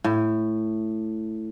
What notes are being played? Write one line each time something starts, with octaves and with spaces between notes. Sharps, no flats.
A2